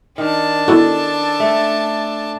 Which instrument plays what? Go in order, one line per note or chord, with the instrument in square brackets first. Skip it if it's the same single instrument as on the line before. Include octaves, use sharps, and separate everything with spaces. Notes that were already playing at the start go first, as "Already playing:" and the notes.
[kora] D#3 [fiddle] D4 A5
[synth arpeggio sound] B3 E4 F#4 [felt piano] A4
[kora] A3